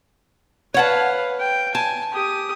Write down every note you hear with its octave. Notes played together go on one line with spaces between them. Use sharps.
B4 C#5 F5 F#5 A5
G5
G#5 A5
G4 D#6